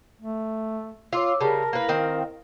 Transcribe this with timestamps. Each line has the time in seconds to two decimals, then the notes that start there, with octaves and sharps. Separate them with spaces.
0.21 A3
1.13 F4 C#5 D6 E6
1.41 C#3 G3 A#4 A5
1.73 A#3 E4 B4 F5
1.89 D#3 C4